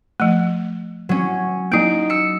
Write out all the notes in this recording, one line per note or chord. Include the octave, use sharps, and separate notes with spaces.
F3 A3
F#3 C#4
F#3 A#3 D#4 D7
E6 C#7